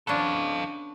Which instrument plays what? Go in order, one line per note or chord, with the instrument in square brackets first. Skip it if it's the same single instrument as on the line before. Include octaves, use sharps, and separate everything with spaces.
[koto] B3 C#4 D4 [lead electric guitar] A4 F5